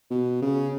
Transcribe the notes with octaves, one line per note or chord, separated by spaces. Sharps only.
B2
C#3